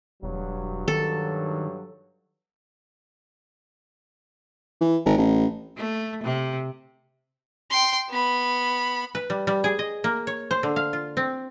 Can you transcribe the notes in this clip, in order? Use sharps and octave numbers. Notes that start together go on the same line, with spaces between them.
E1 G2 F#3
D#3 A4
E3
G#1
A1
A3
C3
G5 C6
B3 B5
B4
G3
G3
G#4
D#5
A#3
C#5
C5
D3
F5
F4
C4